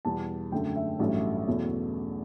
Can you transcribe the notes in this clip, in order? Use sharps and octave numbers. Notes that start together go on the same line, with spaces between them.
E2 B2 G3 A5
F#2 D3 A3 G5
E5
A1 G2 F#3 A3
E2 B2 F#3 A3